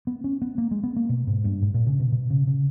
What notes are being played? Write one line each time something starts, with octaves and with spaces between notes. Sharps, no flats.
B3
C#4
B3
A#3
G#3
B3
A#3
B2
G#2
G2
G#2
A#2
C#3
B2
B2
C#3
C#3